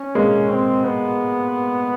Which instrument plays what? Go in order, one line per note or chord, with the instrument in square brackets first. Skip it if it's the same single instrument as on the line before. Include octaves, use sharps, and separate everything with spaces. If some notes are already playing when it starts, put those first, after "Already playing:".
Already playing: [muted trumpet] C#4
[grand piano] G#3 A#3
[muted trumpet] C4
B3